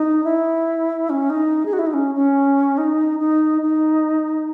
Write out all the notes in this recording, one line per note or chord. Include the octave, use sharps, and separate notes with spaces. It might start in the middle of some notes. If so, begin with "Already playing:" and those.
Already playing: D#4
E4
C#4
D#4
G#4
F#4
E4
D#4
C#4
C#4
D#4
D#4
D#4